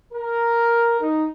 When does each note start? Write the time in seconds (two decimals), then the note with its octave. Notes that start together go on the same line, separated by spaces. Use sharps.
0.13 A#4
1.01 D#4